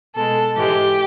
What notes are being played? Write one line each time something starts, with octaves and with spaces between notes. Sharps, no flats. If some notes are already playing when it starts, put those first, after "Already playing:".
B2 G#3 A4
G#2 E3 G#3 G4